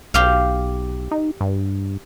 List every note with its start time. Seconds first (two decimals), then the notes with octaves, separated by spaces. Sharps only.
0.14 B1 G4 F5
1.11 D#4
1.41 G2